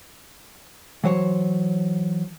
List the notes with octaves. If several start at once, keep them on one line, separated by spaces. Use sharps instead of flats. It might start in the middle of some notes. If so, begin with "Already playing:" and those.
E3 F#3 C5 C#5